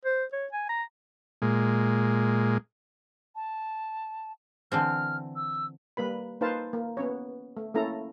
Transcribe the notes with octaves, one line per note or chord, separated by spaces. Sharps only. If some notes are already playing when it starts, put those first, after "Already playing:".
C5
C#5
G#5
A#5
A#2 G#3
A5
D3 E3 C4 F6
E6
G3 A#3 B4 B5
A#3 D#4 B4 C5 F5 A5
A#3
B3 C#4 C#5
A3
A3 A#3 C#4 E4 A4 A#5